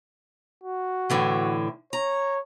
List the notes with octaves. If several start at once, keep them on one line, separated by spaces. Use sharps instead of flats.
F#4
A2 D3 E3
C#5 A#5